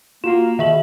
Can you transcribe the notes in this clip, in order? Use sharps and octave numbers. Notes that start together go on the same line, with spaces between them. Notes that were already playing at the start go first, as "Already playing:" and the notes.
A#3 F4 F#4 E7
B2 D#3 G#4 E5 F#7